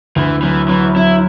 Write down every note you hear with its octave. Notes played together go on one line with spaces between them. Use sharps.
D2 E3
E3 F#3
E3 F#3
F#3 E4